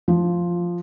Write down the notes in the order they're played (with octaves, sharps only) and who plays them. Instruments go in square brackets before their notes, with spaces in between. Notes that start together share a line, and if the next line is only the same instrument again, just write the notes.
[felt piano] F3